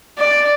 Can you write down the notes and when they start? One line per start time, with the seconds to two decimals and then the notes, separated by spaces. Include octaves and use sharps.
0.19 D5